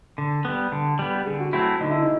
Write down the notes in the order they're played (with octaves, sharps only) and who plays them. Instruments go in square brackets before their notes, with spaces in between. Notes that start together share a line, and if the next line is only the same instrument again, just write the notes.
[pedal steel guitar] D3
G3 B3
D3
G3 B3
[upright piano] G4
[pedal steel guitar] D3 [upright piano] G#4
[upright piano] F#4
[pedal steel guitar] F#3 A3 C4 E4 [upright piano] F#4
[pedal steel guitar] D3 [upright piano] D#4
[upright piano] E4
D#4